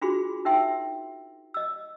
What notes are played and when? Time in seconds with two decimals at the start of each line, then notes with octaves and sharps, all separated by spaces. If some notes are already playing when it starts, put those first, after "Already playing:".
0.01 D4 F4 F#4 G#4 B5 C6
0.45 D#4 A#4 E5 G5 C6
1.54 D#5 E6